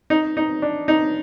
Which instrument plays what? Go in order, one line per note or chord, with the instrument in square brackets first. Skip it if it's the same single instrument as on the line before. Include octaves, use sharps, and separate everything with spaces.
[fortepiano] D#4
D#4
D4
D#4